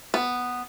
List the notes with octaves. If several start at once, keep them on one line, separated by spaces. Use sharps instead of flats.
B3